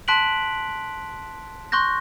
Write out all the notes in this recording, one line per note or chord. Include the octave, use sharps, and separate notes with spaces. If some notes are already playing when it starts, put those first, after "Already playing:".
A5 C6 F#6 B6 D7 F#7
C6 C#6 F#6 G6 A#6